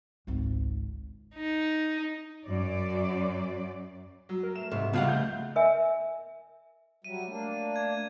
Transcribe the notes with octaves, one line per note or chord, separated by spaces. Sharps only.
G#1 C#2
D#4
F#2 D5
F#3
A#4
A3 E7
C2 G#2 E5
C#2 F3 G3 B3 F5 F#5
A3 G6
A#4 E5 G#5
F#3 G3 E5 D#7
A3 A#3 D4
G#6